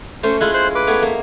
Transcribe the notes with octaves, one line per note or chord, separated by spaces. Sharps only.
A3 C#4 C5
G#3 E4 F4 F#6
C5 F#6
B4 D6
A3 B3 C#5
A#3